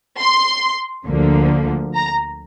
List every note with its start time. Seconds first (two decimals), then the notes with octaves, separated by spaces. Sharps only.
0.20 C6
1.07 D2 D3 F3 A#3
1.95 A#5